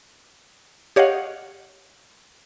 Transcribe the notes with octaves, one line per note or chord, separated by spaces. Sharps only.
G4 C#5 D#5 F5 F#5